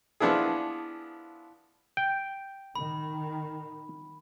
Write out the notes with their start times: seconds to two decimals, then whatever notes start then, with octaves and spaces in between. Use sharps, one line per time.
0.20 F3 B3 D4 E4 G#4
1.97 G5
2.76 D#3 B5